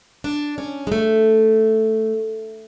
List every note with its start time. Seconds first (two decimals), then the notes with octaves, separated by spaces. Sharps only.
0.24 D4
0.58 C#4
0.87 G#3
0.92 A3